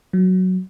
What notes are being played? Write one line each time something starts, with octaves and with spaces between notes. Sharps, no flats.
F#3